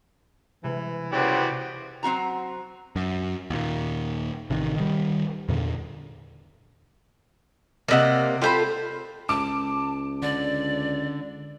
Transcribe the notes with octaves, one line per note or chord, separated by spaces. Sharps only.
C3 E3 G#3
C#3 E3 B3 F#4 G4 C5 D5
F#3 C4 F#4 A#5
F#2
D#2 A#2
A1 C3 D#3
D#3 G3
E2 A#2 D3
C3 A#3 D5 D#5 F#5
F4 G4 A4 C5 B5
C#2 A5 D6
D3 D5